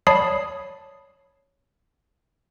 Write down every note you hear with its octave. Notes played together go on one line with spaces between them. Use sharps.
C#5 D5 A5 B5 D#6 C7